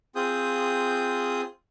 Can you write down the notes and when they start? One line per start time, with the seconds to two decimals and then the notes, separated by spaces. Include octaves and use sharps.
0.16 C4 F4 G#4 D#6 G6